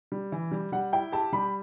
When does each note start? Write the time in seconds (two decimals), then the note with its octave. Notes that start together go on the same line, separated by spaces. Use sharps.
0.12 G3
0.32 E3
0.51 G3
0.72 G3 F#5
0.93 E4 G5
1.12 G4 A5
1.33 G3 B5